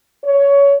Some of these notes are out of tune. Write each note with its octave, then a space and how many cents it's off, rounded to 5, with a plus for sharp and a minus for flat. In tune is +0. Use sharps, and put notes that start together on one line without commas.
C#5 +20